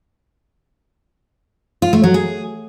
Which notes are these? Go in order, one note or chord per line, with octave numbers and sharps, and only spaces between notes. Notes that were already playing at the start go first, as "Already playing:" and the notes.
F4
A3
F#3
G#4